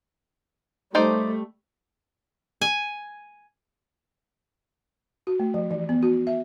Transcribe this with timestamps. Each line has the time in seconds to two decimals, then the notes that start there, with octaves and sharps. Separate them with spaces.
0.95 G3 A3 D#4 C5 D5
2.61 G#5
5.27 F#4
5.40 A3
5.54 F3
5.71 E3
5.89 B3
6.03 F#4
6.27 E5